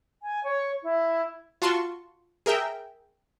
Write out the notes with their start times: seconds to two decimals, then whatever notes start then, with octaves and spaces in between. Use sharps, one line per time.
0.23 G#5
0.44 C#5
0.83 E4
1.62 F4 F#4 A5 C6 C#6
2.46 G#4 A#4 E5 G5